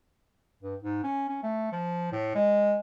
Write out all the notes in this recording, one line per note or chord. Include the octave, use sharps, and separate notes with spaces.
G2
G#2
C#4
C#4
A3
F3
A2
G#3